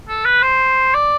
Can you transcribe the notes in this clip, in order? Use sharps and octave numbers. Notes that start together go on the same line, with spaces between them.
A4
B4
C5
D5